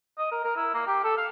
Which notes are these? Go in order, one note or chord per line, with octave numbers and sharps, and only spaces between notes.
D#5
A#4
A#4
E4
A#3
G4
A4
F5